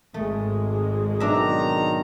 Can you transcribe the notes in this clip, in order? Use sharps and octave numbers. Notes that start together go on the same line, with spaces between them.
G#1 G#3 A3
B1 D#3 D4 E5 A#5